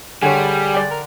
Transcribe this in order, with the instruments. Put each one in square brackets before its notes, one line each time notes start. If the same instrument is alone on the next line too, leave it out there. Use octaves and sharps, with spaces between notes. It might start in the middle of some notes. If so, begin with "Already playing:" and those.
[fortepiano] D3 [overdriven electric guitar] G3 [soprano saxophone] G#4 [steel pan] C#5 G#5
[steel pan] D5 G5
[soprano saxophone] A#4